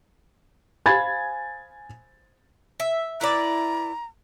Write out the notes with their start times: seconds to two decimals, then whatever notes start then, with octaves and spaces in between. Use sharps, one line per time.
0.86 C5 F5 G#5 B5 G#6 A6
2.80 E5
3.21 E4 B4 D5 A#5